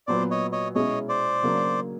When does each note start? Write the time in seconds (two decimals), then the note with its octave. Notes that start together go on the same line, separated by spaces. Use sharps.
0.07 A#2 F#3 B3 C5 D5
0.31 C#5 D#5
0.52 C#5 D#5
0.75 B2 G#3 C#4 E4 C#5 D#5
1.09 C5 D5
1.43 C#3 F#3 A#3 D4